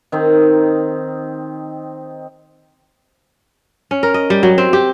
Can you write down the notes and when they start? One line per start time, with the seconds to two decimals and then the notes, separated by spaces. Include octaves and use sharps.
0.12 D#3 C4 D#4
3.91 C#4
4.03 A#4
4.14 D#5
4.30 G3
4.43 F#3
4.58 C4
4.73 G4